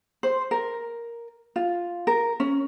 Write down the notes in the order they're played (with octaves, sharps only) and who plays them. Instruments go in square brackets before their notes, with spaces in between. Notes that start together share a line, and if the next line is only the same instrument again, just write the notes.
[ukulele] C5
A#4
F4
A#4
C#4